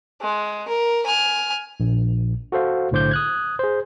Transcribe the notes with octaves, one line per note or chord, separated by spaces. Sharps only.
G#3
A#4
G#5 F6
A#1
F#4 A4 C5 F5
B1 A2 D3 C5 D6 G6
D#6 F#6 G#6
G#4 C5